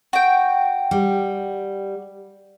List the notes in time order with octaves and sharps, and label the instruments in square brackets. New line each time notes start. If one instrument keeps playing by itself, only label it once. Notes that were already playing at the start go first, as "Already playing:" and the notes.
[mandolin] F#4 G5
[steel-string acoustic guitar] G3